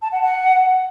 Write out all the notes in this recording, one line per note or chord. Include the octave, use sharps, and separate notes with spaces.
A5
F#5
F#5